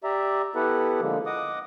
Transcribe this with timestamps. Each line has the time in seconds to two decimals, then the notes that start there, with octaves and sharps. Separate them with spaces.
0.04 G4 D5 E5 A#5
0.55 B3 E4 G4 A4 B4 F#5
1.01 D3 F3 G#3 A#3
1.26 D#5 F#5 D6 D#6